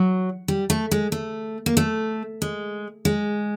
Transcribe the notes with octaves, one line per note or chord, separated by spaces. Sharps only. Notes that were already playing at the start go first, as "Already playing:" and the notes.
Already playing: F#3
G3
A3
G#3
A3
A#3
A3
G#3
G#3